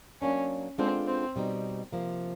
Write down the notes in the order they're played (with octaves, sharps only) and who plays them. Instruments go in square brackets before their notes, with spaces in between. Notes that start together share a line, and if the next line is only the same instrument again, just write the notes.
[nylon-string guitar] F#3 A#3 D4 [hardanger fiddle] C#4
[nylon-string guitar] G#3 B3 D4 F4 A4 [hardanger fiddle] C4
[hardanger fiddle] C4
[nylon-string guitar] B2 G3 C4 D#4
C3 F3 A#3